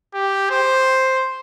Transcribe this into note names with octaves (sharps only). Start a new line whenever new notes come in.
G4
C5